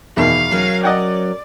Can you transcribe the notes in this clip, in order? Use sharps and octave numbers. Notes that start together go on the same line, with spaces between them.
E2 B2 D#3 F5
F#3 C#4 A#4
D5 D#5 F#5 G5